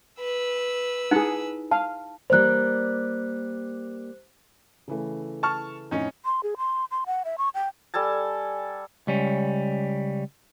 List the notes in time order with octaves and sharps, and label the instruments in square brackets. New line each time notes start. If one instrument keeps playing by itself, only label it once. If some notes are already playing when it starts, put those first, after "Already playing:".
[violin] B4 E6
[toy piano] D#4 E4 [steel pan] G#4 F#5
[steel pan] F5 [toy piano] A5
[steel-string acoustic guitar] G3 A#3 D5 [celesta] C5 F#6
[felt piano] C#3 E3 A3
[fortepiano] A5 C#6 F6
[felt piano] F2 A2 [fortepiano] C#4 D#4
[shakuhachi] C6
G#4
C6
C6
F#5
E5
C#6
G5
[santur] G3 A4 G#5 A5
[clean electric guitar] C#2 G3 C#4